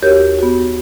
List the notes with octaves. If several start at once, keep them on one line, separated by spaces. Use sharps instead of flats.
D#2 F#4 G4 A#4 C#5 G6
B3 F#4